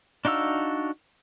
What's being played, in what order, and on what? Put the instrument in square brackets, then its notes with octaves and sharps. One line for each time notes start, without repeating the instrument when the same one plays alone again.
[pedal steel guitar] D4 D#4 F#4 F5 E6